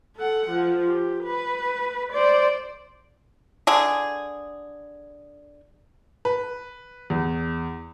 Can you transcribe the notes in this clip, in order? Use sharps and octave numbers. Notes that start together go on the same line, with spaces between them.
A4 F#5
F3
G4
B4
C5 D5
D3 G#4
B4
E2